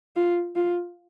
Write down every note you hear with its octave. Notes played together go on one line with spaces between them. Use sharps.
F4
F4